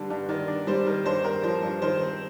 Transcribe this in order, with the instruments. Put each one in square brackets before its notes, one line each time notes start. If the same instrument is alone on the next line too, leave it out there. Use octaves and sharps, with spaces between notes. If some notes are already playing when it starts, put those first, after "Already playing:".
Already playing: [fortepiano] G2 D3 G3
G2
[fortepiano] D#3 [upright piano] D5
[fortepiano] D4
[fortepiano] G3 [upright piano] C5
[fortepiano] D#3
[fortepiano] G2 [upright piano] C5
[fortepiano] C4 [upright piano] A#4
[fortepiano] F3 [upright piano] C5
[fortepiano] G2
[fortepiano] D#3 [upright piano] C5
[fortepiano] C4